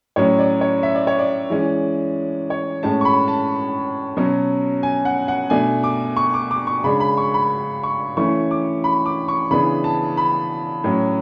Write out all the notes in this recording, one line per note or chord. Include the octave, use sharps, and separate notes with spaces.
A2 F#3 C#4 C#5
D5
C#5
E5
D5
C#5
D5
E3 G#3 C#4
C#5
A2 G#3 C#4 A5
C#6
B5
A5
B2 F#3 C#4
G#5
F#5
F#5
B2 A3 D4 G#5
D6
C#6
D6
D6
C#6
C#3 G#3 D4 B5
B5
C#6
B5
C#6
E3 A3 C#4 C#6
D6
B5
D6
C#6
C#3 E3 B3 D4 B5
A5
B5
A2 F#3 C#4